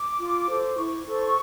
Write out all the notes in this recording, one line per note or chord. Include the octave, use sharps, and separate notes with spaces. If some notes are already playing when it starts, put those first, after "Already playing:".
Already playing: D6
F4
A4 C5
E4 C#6
A4 C5